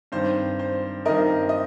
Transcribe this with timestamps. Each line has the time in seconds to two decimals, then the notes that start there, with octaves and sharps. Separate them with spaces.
0.12 G2 D#3 C4 C5
0.59 C5
1.05 G2 D#3 C4 A#4 D#5
1.49 D#5